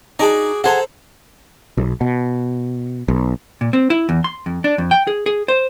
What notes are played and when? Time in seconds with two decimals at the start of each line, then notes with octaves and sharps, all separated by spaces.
0.19 D#4 F#4 G#4 D5
0.64 G#4 A4 C5 F#5 A#5
1.77 B1
2.01 B2
3.08 B1
3.61 A#2
3.73 C4
3.90 E4
4.09 E2
4.24 C6
4.46 F2
4.64 D4
4.78 F2
4.91 G5
5.07 G#4
5.26 G#4
5.48 C5